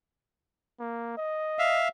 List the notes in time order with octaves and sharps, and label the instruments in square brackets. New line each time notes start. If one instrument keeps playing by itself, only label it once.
[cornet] A#3
D#5
[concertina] E5 F5